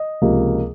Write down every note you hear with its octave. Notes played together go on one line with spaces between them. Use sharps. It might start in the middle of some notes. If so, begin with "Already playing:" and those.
Already playing: D#5
C#2 C3 F3 A#3